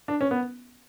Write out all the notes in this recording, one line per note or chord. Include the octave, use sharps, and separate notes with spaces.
D4
C#4
B3